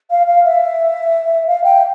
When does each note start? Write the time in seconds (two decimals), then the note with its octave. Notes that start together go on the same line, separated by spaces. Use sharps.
0.10 F5
0.27 F5
0.45 E5
1.47 F5
1.64 G5